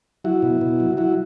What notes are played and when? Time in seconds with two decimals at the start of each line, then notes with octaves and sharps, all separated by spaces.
0.25 F#3 E4 F#4
0.42 B2
0.61 B2
0.80 F#3
0.97 F#3 E4 F#4